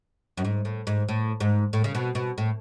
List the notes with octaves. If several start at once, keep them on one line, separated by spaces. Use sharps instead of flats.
F#2
G#2
A2
G#2
A2
G#2
A2
C#3
B2
B2
A2